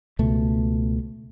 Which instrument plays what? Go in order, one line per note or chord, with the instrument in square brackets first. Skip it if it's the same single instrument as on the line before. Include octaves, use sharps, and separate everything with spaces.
[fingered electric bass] C#2 B2 A3